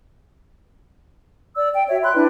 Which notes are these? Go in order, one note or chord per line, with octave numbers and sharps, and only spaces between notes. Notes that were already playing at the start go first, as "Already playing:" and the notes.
D5 E6
G5
F#4 C#5 E5
B5 C6 F#6
D4 E4 B4